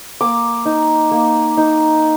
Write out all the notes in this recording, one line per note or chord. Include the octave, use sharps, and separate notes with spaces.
A#3 D6
D#4
A#3
D#4